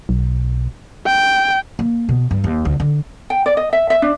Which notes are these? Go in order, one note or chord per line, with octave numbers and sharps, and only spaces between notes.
B1
G5
A#3
B2
G2
D#2
D2
D3
G5
D5
D#5
E5
E5
D4